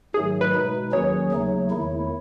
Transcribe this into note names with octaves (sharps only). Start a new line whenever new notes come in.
G#2 D#3 F#3 A3 G#4
B4
B2 G#3 D#4
D#2 D#3 F#3 C#4 G#4 C#5
D#2 C#3 F#3 A3 D#4
E2 D#3 A3 E4